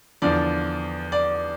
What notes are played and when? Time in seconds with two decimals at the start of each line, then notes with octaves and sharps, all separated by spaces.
0.22 E2 D3 F3 D5
1.12 D5